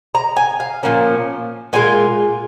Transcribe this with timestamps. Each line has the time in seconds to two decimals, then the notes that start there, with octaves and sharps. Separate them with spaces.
0.15 A#5
0.36 G#5
0.60 F5
0.83 A#2 F3 A#3 C#4
1.73 A#2 G#3 F4 G#5